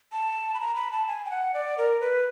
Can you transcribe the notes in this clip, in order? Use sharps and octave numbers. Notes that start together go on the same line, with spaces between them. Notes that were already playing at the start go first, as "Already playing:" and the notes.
A5
B5
A#5
B5
A5
G#5
G5
F#5
D5
A#4
B4